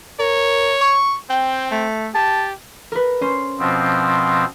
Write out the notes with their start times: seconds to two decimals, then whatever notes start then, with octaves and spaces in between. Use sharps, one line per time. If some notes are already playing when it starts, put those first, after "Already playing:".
0.20 A#4 C#5
0.81 C#6
1.30 C4 G5
1.71 A3
2.15 G4 A5
2.92 A#4 B4
3.21 C#4 C5
3.59 B2 F3 C4